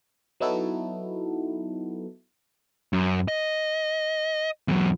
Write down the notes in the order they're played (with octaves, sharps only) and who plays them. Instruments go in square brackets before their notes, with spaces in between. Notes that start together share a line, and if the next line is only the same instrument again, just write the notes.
[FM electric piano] F#3 B3 D#4 E4 F#4 A4
[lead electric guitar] F#2
D#5
E2 F#3